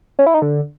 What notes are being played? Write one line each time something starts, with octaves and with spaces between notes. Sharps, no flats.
C#4
E4
D#4
D3